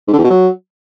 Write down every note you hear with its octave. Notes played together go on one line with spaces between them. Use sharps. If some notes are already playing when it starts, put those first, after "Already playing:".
G#2
D3
E2
B2
F#3